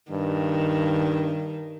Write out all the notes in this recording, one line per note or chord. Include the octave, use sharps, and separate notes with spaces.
G2 D#3